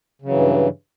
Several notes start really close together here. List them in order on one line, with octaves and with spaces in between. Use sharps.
C#3 F#3 E3 G2